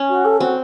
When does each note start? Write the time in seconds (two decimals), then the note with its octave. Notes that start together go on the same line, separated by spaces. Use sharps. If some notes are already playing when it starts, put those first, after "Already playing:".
Already playing: C#4
0.10 F#4
0.25 A4
0.40 C4 F#4